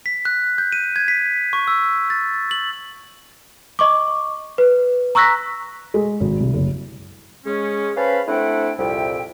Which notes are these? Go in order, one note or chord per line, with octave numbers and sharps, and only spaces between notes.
B6
F#6
G6
D#7
G#6
B6
C#6
E6
A6
F#7
D#5 C#6 D6
B4
A#5 C#6 E6 F#6 A#6 B6
G#3
G#1
C2
F#1
G#3 C#4
C#4 B4 C5 F5 A5 B5
A3 C4 D4 E4 F#5 G5
C2 F2 A#2 G3 E5 G5